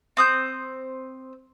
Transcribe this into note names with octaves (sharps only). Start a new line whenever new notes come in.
C4 D#6 G6